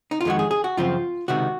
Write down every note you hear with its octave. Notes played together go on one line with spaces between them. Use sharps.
D#4
F4
F2 D#3 G#3 F#4
G#4
G#4
F#4
F#2 C#3 F3 C4 F4
C#2 C3 D#3 F#4